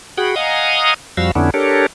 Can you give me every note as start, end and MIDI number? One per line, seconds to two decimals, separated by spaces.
0.17 0.35 66
0.17 0.35 68
0.17 0.35 78
0.17 0.35 79
0.17 0.35 83
0.36 0.94 75
0.36 0.94 77
0.36 0.94 78
0.36 0.94 80
0.36 0.94 82
0.36 0.94 87
1.17 1.31 41
1.17 1.31 53
1.17 1.31 55
1.17 1.31 66
1.17 1.31 77
1.17 1.31 88
1.35 1.50 41
1.35 1.50 50
1.35 1.50 59
1.35 1.50 61
1.35 1.50 62
1.35 1.50 64
1.54 1.86 62
1.54 1.86 67
1.54 1.86 69
1.54 1.86 70
1.54 1.86 73